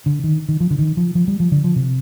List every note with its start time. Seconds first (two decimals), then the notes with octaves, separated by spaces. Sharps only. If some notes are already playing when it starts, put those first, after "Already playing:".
0.06 D3
0.24 D#3
0.49 D#3
0.60 F3
0.71 D3
0.79 D#3
0.97 F3
1.15 F3
1.28 G3
1.40 F3
1.52 D3
1.64 F3
1.76 C3